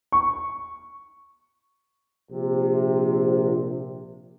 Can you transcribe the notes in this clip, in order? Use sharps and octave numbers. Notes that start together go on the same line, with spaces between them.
C#6
A#1 C3